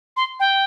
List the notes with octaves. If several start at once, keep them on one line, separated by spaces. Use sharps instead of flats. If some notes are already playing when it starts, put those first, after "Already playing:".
C6
G5